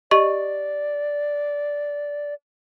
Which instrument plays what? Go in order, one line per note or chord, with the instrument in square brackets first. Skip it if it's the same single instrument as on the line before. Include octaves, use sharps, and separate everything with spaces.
[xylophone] G4 D#5 C#6 [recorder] D5